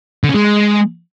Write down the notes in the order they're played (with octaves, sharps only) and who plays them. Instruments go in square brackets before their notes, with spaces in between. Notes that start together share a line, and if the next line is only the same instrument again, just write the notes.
[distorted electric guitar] D3
C#4
G#3